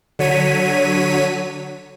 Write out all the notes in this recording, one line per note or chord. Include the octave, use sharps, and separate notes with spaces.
D3 F#3 C#5 B6 D#7